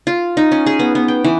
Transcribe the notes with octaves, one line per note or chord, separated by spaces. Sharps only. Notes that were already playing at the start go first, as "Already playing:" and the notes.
F4
D#4
C#4
G#4
B3
B3
G5
E3